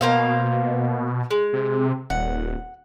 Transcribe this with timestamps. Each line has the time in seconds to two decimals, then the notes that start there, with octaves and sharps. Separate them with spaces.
0.01 B2 A#3 C5 F5
1.31 G#3
1.53 C3
2.10 D#1 F#5